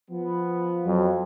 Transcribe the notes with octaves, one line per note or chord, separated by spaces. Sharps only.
F3 B3
F2 F#3